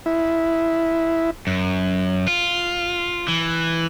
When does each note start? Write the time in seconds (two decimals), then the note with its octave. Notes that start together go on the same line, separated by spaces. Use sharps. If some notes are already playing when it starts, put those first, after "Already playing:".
0.06 E4
1.47 F#2
2.28 F4
3.28 E3